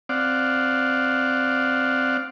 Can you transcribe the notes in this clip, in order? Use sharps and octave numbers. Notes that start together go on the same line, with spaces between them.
C4 D5 F5 F#5